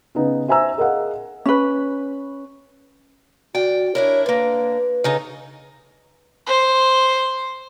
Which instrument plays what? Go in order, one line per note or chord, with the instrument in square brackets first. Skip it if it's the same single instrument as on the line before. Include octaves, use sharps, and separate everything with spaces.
[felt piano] C#3 B3 D#4
C5 E5 G#5 A#5 E6
G#4 A#4 D#5 F5 F#5
[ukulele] C#4 B4
[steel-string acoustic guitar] D2 D5 G5 [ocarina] F#4
[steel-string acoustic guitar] D4 E4 A#4 [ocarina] C#5
[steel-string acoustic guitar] D3 A#3 [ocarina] B4
[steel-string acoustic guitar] C#3 D#4 A4
[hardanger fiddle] C5 C6